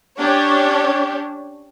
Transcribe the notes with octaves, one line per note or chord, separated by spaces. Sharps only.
C#4 D4 G4 C#5